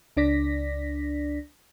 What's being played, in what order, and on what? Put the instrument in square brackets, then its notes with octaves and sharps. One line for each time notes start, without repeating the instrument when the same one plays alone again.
[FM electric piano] C#2 D4 D5 A#6 B6